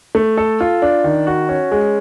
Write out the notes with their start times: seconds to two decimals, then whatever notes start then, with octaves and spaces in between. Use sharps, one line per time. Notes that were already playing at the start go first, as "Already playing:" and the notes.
0.15 A3
0.38 A4
0.61 F4
0.82 D4
1.04 D#3
1.27 F#4
1.49 C#4
1.72 G#3